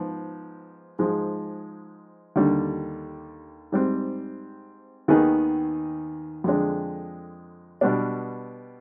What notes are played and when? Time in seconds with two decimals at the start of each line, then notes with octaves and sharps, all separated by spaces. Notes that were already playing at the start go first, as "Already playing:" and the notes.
Already playing: G#2 F3 B3
0.99 G#2 F3 G#3
2.36 D#2 D3 G3
3.72 G#2 G3 C4
5.08 D#2 D#3 B3 D#4 G#4
6.44 F2 D3 G#3 D4
7.81 B2 G3 B3 D4